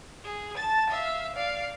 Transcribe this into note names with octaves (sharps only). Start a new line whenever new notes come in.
G#4
A5 A6
E5 F5
D5 F5